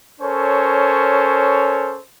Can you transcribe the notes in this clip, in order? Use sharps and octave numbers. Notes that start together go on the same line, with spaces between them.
C#4 A4 A#4 C5 C#5